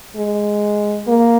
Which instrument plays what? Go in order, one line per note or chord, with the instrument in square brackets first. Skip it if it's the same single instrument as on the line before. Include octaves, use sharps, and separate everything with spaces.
[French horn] G#3
A#3